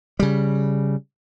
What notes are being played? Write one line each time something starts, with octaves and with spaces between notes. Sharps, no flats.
C#3 G3